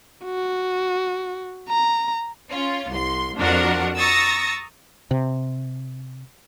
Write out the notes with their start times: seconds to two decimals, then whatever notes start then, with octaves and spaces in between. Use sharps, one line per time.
0.25 F#4
1.69 A#5
2.51 C#4 F4
2.91 C2 C6
3.37 F2 D4 F4 F#4 A#4 F#5
3.97 A#5 C#6 D#6 E6 A6 A#6
5.11 C3